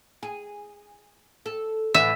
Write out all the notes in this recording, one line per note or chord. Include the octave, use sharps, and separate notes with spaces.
G#4
A4
A2 D3 E3 E5